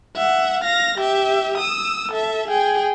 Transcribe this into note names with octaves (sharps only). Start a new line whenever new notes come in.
E5 F#5
F5 A#6
G4 E5
D#6 E6
A4 E5
G#4 G5